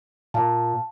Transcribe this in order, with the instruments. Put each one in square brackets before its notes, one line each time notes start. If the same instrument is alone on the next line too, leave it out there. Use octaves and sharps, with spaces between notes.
[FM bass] A#2 [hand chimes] F5 A5